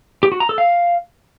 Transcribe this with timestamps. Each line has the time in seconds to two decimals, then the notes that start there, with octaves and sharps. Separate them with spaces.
0.23 G4
0.32 F#4
0.40 A#5
0.49 A4
0.58 F5